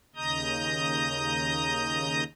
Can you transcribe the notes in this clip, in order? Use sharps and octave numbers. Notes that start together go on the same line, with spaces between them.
D#2 C#3 D#5 A#5 D#6 G6